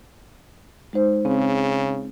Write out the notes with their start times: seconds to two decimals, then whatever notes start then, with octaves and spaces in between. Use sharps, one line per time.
0.93 G#3 D#4 C5
1.25 C#3 C4 G#4